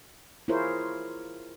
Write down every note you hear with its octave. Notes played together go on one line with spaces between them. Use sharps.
E4 F4 G#4 A#4 C5 C#5